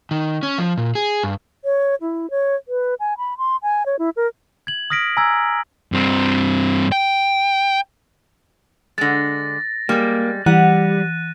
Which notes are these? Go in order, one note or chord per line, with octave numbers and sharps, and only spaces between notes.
D#3
C#4
F3
A#2
G#4
G2
C#5
E4
C#5
B4
G#5
B5
C6
G#5
C#5
E4
A#4
G#6 F#7
D#6 F6 A#6 B6 D7
G#5 A#5 D#6 E6 G#6
G2 C4
G5
D3 G#3 A6 A#6
G3 G#3 A#3
E3 G3 F#5 F#6 D#7